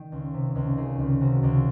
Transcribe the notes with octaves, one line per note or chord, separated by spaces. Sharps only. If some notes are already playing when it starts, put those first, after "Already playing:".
Already playing: D#3
C#2
C3
C#2
D#3 G#4
C#2
C3 F#4
C#2